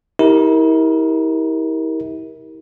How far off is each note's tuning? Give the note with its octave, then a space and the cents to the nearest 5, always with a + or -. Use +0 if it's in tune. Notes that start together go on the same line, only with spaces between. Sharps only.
E4 -40 G4 +0 A#4 +0